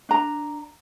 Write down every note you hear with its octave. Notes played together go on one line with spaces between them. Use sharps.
D4 A#5